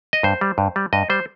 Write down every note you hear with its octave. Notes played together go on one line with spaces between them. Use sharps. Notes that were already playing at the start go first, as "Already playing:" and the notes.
D#5
G2 C5
G3
G2
G3
G2 D#5
G3 C5